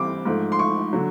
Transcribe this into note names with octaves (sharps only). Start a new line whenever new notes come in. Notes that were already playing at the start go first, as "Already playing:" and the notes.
Already playing: E3 G3 C4 D6
G#2 F3 A3
C6
C#6
D3 F#3